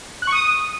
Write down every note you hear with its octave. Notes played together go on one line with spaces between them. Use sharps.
F#6
C#6
D#6